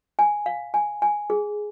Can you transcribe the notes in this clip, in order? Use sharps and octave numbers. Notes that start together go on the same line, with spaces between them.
G#5
F5
G#5
G#5
G#4